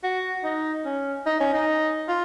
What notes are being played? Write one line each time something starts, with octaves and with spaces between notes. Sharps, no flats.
F#4
D#4
C#4
D#4
C#4
D#4
F4